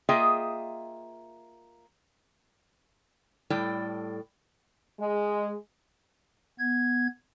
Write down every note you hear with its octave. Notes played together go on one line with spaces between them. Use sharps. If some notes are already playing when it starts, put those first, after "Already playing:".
A#3 F4 G#4 D#5 E5 G5
A2 G3 A4 D5 G5
G#3
B3 G#6